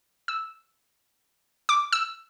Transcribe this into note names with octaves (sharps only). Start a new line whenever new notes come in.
E6
D6
E6